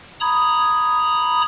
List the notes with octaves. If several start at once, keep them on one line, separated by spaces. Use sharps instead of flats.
A#5 B5 D#6 G#6